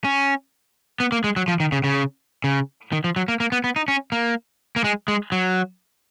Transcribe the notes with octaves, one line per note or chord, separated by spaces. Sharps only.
C#4
B3
A#3
G#3
F#3
F3
D#3
C#3
C#3
C#3
D#3
F3
F#3
A#3
A#3
B3
B3
D#4
C#4
A#3
A#3
G#3
G#3
F#3